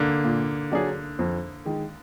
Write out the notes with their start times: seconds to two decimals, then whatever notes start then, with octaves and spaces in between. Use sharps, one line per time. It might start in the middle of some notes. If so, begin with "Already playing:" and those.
Already playing: D3 A#3
0.24 A#2
0.72 F#3 D4 G#4
1.19 F2
1.65 D#3 G#3